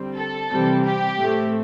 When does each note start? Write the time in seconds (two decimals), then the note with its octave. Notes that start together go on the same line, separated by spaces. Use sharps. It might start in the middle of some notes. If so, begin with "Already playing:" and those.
Already playing: D3 G3 C4
0.17 A4
0.50 C3 E3 G3 C4
0.84 G4
1.18 A2 A3 C4